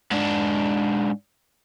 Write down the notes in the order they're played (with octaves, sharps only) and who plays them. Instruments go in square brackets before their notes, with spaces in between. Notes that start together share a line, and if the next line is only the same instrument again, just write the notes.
[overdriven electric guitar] G#2 D4